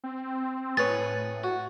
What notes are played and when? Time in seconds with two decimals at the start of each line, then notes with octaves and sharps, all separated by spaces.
0.04 C4
0.77 A2 G#4 B4 C#5 A6
1.43 F#4